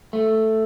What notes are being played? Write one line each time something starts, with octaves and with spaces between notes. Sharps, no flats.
A3